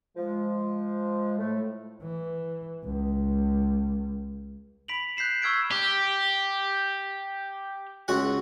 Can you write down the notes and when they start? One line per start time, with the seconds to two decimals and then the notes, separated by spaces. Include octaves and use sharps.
0.17 F3 G#3
1.38 A2 A3
2.02 E3
2.84 C#2
4.88 B5 B6 D7 F7 F#7
5.17 F#6 G6 B6 C7 E7
5.42 C#6 E6 F6 G#6 B6 D7
5.72 G4
8.08 C#2 F#4 F#5